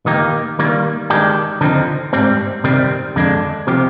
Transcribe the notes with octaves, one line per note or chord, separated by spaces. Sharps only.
D#3 A#3 D#4 G4
D#3 G3 A#3
D#3 G#3 D4 G4
D3 F3 C4 D#4
G#2 G3 C4
C3 D#3 G3 C4
F2 D3 G#3 D4
C3 F3 C4 G4